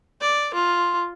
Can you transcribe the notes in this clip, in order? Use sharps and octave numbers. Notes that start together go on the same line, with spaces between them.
D5
F4